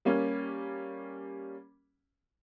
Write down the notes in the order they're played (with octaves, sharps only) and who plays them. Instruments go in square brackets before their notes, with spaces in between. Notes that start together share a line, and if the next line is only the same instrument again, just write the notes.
[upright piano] G3 A#3 C#4